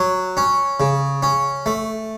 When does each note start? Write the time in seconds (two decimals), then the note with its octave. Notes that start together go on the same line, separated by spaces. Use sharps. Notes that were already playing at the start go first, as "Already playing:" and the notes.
Already playing: F#3
0.37 C#4
0.80 C#3
1.23 C#4
1.66 A3